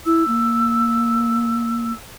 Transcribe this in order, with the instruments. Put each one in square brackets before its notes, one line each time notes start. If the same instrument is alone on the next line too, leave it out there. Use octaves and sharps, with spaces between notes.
[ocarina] E4 [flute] E6
[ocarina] A#3